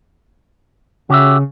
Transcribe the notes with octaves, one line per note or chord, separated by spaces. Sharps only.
C#3 F#4 G4 E5